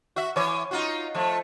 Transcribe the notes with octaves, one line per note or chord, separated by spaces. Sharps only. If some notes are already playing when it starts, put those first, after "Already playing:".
F#4 E5
E3 C#5
D#4 F4 F#4
F3 A3